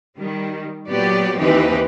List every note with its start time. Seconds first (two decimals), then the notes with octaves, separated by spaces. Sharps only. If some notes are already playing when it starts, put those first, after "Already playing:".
0.16 D#3 G3
0.86 A#2 F#3 B3 G4 D5
1.39 D#2 E3 C4 D#4 G4 B4